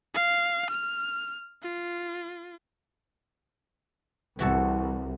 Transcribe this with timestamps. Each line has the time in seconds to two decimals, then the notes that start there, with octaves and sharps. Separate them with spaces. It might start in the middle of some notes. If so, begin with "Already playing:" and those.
0.14 F5
0.70 F6
1.63 F4
4.39 C2 E3 F#4 A4